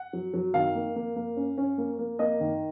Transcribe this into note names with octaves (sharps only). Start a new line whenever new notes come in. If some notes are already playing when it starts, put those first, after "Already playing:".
Already playing: F#5
F#3
F#3
D#3 F5
A#3
A#3
A#3
C#4
C#4
A#3
A#3
A#3 D#5
D#3